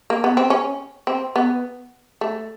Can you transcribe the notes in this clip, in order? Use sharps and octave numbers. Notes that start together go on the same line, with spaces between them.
A#3
B3
C4
C#4
C4
B3
A3